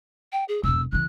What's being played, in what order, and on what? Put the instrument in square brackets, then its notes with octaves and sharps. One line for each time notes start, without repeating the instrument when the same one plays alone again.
[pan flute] G5
G#4
[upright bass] E1 F2 [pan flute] E6
[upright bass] C#3 E3 [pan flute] F#6